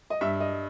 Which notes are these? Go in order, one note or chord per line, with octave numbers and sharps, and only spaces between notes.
D#5
G2 E5
D#5